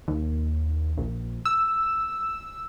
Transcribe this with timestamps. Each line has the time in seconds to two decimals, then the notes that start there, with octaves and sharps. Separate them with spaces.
0.08 D#2
0.98 A#1
1.45 E6